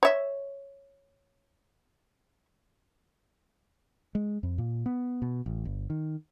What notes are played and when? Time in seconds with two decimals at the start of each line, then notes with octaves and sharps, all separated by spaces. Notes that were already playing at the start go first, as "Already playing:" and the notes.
0.03 C#5 E5
4.15 G#3
4.43 F2
4.58 A#2
4.86 B3
5.22 B2
5.46 A1
5.65 G1
5.90 D#3